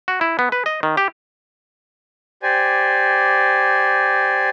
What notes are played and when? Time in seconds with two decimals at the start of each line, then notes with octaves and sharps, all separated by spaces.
0.08 F#4
0.21 E4
0.39 B3
0.52 B4
0.66 D#5
0.83 D#3
0.97 G4
2.43 G4 C5 D5 G#5